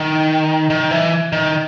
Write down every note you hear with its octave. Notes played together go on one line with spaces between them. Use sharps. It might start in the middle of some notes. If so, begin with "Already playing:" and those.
Already playing: D#3
D#3
E3
D#3